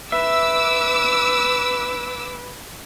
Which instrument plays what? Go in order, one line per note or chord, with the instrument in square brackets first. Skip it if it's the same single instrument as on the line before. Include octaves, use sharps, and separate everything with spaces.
[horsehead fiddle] B4 [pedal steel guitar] E5 [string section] D6 E6